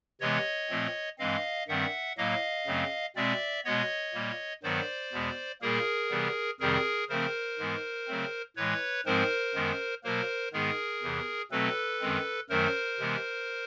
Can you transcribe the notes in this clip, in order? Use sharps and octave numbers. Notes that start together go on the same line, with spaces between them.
C3 E3 G#3 B3 C#5 D#5
A#2 F3 A3 C4
G2 E3 G#3 C4 D#5 F5
G2 D#3 G3 C4 E5 F#5
A2 F#3 A#3 D#5 F5
F#2 C#3 F#3 A3 C4
B2 G#3 C4 D5 E5
B2 G#3 B3 C#5 D#5
A#2 G3 A#3
G2 D#3 F#3 B3 C5 D5
E2 B2 G#3 B3
A#2 G3 A#3 G#4 A#4
C3 E3 G3 B3
F2 C3 D#3 G3 C4 G#4 A#4
C#3 F3 A3 C4 A#4 C5
G#2 E3 G#3 B3
C#3 F#3 A3 C4
A2 E3 G#3 B4 C#5
G#2 F3 G#3 C4 A#4 C5
F#2 D#3 G#3 B3
B2 F#3 A#3 A#4 C5
G#2 D#3 G#3 B3 G#4 A#4
E2 C3 E3
B2 F#3 A3 C4 A4 B4
F#2 D#3 G#3 C4
F#2 D#3 F#3 A3 A#4 C5
C3 E3 G#3 B3